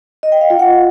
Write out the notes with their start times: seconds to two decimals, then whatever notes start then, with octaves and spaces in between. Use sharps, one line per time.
0.23 D#5
0.32 G5
0.41 F5
0.50 F4
0.59 F#5